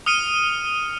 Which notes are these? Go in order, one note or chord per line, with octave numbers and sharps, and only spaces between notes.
D#6 F6 C#7 D#7 G7